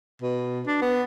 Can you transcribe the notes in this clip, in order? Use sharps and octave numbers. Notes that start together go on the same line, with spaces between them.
B2
D4
B3